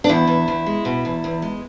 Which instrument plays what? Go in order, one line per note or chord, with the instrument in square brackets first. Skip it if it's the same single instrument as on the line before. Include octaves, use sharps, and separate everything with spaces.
[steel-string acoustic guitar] D4
E2 E4
E2
E2
G#3
B2
E2
E2
G#3